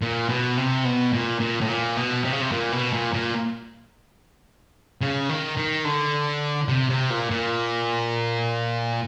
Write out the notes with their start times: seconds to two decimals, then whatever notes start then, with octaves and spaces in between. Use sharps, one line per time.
0.02 A#2
0.29 B2
0.57 C3
0.85 B2
1.13 A#2
1.40 A#2
1.61 A2
1.68 A#2
1.97 B2
2.24 C3
2.33 C#3
2.41 C3
2.52 A#2
2.72 B2
2.93 A#2
3.14 A#2
5.01 C#3
5.29 D#3
5.57 D#3
5.85 D3
6.68 C3
6.90 C3
7.10 A#2
7.31 A#2